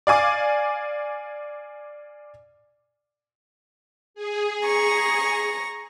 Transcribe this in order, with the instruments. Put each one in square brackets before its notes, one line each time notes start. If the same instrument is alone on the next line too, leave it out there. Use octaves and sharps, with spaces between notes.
[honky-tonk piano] D5 F5 G#5 D6
[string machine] G#4
[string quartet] A#5 C#6 A#6